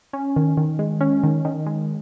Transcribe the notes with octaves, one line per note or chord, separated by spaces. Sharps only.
C#4
D#3
D#3
G#3
C#4
D#3
D#3
G#3